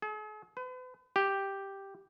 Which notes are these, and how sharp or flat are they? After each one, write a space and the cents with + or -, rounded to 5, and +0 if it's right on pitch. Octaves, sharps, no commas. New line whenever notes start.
G#4 +45
B4 +40
G4 +0